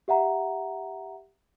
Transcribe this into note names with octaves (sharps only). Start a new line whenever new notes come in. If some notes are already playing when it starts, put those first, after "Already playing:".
G4 E5 F#5 A#5